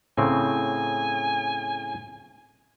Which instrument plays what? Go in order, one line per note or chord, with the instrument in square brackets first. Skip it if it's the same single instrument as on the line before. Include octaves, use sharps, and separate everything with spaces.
[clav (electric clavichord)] A2 C#3 C4 [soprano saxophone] G#5